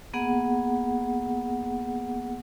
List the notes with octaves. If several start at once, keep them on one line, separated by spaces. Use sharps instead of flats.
A#3 B3 G#4 F#5